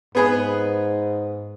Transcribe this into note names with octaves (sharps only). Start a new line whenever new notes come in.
G#2 B3 G#4 B4